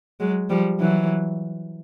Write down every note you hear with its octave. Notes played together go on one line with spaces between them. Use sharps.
F#3 G#3
F3 G3
E3 F#3